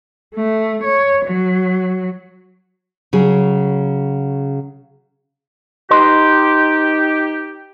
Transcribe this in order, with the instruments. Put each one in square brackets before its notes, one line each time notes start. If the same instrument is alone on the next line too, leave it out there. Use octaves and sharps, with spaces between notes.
[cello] A3
C#5
F#3
[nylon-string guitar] C#3 F#3 G#4
[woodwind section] D#4 G4 [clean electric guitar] B4 D#5 C6